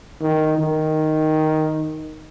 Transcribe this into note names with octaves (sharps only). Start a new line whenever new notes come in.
D#3
D#3